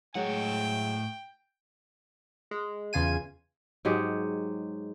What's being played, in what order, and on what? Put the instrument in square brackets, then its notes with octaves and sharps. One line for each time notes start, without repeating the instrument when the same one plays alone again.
[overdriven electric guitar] A2 F#5 [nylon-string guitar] F#3 G#3 F#4 [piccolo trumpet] G5
[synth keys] G#3
E2 C#3 F4 G#5 D#7
[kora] G#2 F#3 G#3 G4